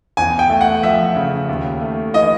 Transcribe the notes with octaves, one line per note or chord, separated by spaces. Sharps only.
E2 G#5
G5
A3
F#5
F3 E5
C#3
D#2
A3
E3 D#5